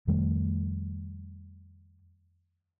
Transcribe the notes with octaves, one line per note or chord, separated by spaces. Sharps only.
F2 D#3 G3 A3